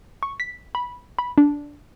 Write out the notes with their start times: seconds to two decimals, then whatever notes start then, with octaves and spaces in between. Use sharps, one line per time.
0.23 C#6
0.40 B6
0.75 B5
1.19 B5
1.38 D4